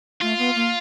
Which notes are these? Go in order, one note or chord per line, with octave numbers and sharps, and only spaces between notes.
A3 F4
B3
A#3